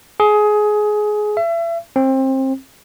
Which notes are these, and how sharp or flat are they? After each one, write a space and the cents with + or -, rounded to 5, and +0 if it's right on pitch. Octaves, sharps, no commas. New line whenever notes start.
G#4 +20
E5 +35
C4 +25